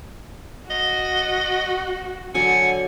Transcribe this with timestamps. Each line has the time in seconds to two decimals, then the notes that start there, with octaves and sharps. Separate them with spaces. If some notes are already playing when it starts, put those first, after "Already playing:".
0.70 F#4 D#5
2.35 D3 F#3 D5 G#5 C#7